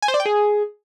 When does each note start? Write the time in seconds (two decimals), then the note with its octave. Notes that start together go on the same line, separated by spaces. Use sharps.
0.02 G#5
0.08 C5
0.14 D5
0.20 G5
0.25 G#4